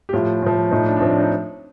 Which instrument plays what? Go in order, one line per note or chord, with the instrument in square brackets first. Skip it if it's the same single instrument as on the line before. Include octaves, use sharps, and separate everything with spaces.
[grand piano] G4
A2 F3 F4
A2 F3
A2 F3 D#4
D4
D4
A2 F3 C4
D4
D#4